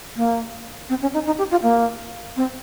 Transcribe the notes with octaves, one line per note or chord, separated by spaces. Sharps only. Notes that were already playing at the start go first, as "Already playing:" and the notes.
A#3
C4
C#4
D#4
D#4
G4
F4
A#3
C4